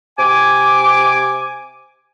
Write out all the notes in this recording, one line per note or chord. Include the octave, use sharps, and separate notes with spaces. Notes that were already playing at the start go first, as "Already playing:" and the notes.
C3 G#5 D6